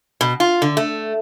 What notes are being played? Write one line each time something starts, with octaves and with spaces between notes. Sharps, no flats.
B2
F4
D3
A3